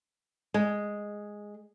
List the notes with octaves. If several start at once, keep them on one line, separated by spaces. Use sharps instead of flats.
G#3